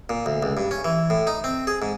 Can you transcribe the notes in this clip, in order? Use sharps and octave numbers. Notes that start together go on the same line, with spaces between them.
A#2
D2
C#2
G2
C#4
E3
A2
D#4
C4
G#4
G#2